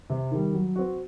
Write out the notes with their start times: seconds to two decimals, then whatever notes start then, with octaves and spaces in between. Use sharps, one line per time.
0.10 C3
0.31 D#3 G3
0.53 F#3
0.76 C4 F#4